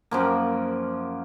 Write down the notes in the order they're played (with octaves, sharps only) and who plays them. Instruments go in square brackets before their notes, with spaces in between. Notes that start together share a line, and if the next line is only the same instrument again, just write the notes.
[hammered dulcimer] F#2 F3 A#3